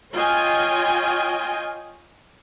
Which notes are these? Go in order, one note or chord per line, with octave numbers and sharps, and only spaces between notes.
F4 C#5 D#5 G5 G#5